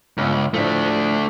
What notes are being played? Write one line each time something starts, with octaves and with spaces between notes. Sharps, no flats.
G1 C#2
A2 F3 A3 D4